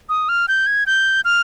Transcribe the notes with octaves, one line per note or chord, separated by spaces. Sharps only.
D#6
F6
G6
G#6
G6
F6